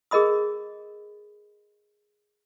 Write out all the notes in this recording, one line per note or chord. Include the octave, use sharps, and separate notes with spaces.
G#4 A#4 D#5 B5 D#6